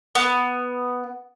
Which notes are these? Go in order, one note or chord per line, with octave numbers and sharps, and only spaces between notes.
B3